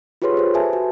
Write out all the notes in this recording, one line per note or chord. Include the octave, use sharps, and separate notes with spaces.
F4 G4 G#4 B4 C#5 C6
G4 C5
A4 B4 E5 G#5 A5
F#4